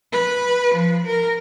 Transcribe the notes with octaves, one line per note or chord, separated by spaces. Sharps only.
B4
F3
A#4